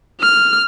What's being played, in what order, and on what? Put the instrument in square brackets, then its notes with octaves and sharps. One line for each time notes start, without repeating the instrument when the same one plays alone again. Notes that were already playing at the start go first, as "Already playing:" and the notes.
[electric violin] F6